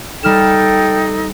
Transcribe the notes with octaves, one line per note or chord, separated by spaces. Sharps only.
G3 D#4 A4 G5 F6 E7